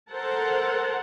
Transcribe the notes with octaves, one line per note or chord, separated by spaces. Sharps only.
A4 A#4 C5 F#5 A5